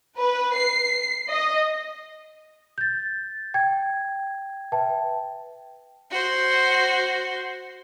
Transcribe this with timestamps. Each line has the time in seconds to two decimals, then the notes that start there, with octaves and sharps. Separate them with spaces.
0.17 B4
0.56 C7
1.31 D#5
2.78 G6 A6
3.54 G5 G#6
4.72 B4 E5 G5 A5
6.11 F#4 C5